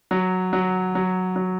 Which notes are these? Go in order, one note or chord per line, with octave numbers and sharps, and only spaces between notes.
F#3
F#3
F#3
F#3